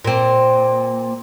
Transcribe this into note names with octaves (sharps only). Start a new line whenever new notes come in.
A#2 C4